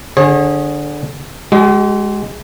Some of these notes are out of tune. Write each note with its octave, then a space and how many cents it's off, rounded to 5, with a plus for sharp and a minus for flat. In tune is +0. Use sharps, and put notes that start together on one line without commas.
D3 +0 G#4 +0 C#5 -40
G#3 +0 F#4 +45